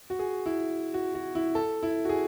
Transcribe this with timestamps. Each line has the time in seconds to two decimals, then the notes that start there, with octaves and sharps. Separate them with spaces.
0.10 F#4
0.19 G#4
0.46 E4
0.94 F#4
1.15 F#4
1.35 E4
1.55 A4
1.83 E4
2.05 F#4
2.09 G#4